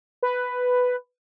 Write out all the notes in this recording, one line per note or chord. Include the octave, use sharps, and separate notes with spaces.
B4